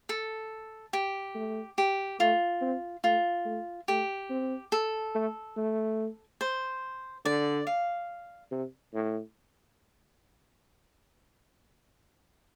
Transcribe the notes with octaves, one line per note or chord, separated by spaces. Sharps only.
A4
G4
A3
G4
A3 F4
C4
A3 F4
A3
A3 G4
C4
A4
A3
A3
C5
D3 D5
F5
C3
A2